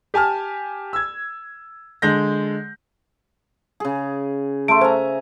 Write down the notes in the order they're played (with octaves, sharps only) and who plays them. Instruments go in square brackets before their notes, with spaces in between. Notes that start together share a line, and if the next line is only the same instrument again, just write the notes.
[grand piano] G4 G#5 A5 F6
E6 G#6
D3 G#3 G6 A#6
[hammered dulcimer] C#3 G#4
[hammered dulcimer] A3 A4 E5 [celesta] C6 D7
[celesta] C5 [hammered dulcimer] G#5 A#5